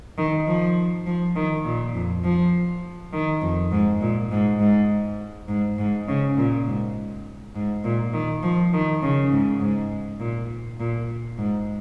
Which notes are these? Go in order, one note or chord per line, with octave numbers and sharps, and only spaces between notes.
D#3
F3
F3
D#3
A#2
F2
F3
D#3
F2
G#2
A#2
G#2
G#2
G#2
G#2
C#3
A#2
G#2
G#2
A#2
D#3
F3
D#3
C#3
G#2
G#2
A#2
A#2
G#2